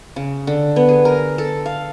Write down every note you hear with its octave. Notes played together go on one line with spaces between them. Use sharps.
C#3
D3
B3
G#4
A#4
A4
F5